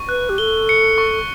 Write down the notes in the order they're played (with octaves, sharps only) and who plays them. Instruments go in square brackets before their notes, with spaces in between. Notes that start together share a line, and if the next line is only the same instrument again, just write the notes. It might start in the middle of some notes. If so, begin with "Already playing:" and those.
Already playing: [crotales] C#6
[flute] B4 [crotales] F#6
[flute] G4
[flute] A4 [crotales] G7
[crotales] C#7
C#6